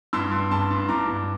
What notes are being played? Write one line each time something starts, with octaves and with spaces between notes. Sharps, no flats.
G2 C6 E6
G2
G2 A5 C6
G2
G2 A#5 D6
G2